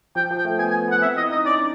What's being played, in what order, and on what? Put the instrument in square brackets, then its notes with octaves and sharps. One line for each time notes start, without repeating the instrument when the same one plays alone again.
[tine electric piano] F3 [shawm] G5
[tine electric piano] F3
[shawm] G5
[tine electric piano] A3
[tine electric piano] B3 [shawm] G#5
[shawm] G#5
[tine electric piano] B3 [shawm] F#5
[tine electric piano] C4 [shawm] E5
[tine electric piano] E4 [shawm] D#5
[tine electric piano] D#4 [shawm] D#5
[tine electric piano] C#4 [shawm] D5
[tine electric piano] D4